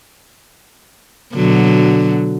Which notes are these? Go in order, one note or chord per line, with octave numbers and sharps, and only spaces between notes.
B2 D3 F#3